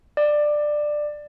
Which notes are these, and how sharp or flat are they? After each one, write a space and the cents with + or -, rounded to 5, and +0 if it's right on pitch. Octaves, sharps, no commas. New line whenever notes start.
D5 +15